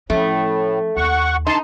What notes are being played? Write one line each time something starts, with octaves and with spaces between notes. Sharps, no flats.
A2 F3 A3 C#4
D#2 F#5 C#6
D#4 A5 C6